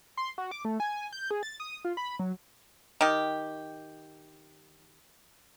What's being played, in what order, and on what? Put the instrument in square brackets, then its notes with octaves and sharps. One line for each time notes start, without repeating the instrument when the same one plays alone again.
[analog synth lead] C6
F#4
D6
A3
G#5
G6
G#4
A6
D#6
F4
B5
F#3
[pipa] D#3 G4